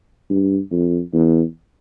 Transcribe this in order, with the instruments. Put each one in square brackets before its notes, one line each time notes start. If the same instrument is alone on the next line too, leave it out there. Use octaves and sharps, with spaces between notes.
[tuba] G2
F2
E2